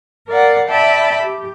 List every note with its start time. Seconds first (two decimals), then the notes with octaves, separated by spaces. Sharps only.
0.27 A#4 D5 F5 F#5
0.67 D5 E5 G5 A5 B5
1.21 G4